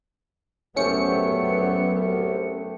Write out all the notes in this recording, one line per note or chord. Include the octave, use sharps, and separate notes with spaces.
C2 F#3 A3 B3 C#4 G4 A4 C#7